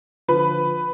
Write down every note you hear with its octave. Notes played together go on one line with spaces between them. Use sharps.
D3 F3 B4